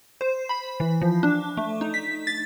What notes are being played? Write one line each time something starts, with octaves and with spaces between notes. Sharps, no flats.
C5
B5
E3
F3
D4
A3
D#4
B6
A6